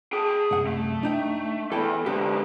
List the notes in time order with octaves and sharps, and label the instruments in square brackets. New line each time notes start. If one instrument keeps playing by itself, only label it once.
[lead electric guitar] G#4 G5
[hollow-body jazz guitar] C2 F#2 F#5
[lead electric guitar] A3
[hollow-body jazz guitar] D4 D#4 G5
[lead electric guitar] E3 B3 [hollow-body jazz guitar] A4 G5
[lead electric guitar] G#2 B3 [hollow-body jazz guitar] D3 G4